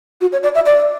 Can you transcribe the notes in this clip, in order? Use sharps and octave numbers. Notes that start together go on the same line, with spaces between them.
F#4
C#5
D5
E5
D5